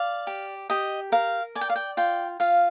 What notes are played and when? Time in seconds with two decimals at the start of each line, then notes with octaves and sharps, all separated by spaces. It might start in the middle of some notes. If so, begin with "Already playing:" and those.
Already playing: D5 F5
0.27 G4
0.70 G4 D#5
1.12 A#4 F5
1.55 D5 G#5
1.61 G5
1.70 F5
1.76 G5
1.97 F4 G5
2.40 F4 F5